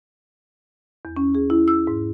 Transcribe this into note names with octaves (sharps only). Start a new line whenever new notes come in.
E2
C#4
G#4
E4
E6
G#2